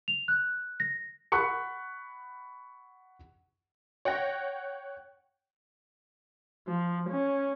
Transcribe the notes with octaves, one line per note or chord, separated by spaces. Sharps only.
F7
F#6
A#6
F#5 B5 C#6 F#6 C#7
C#5 F#5 G5 A#6
F3
C#4